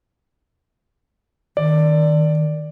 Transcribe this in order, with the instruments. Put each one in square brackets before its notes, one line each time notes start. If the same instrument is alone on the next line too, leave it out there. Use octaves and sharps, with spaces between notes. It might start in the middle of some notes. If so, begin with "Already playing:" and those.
[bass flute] D#3 [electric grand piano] D5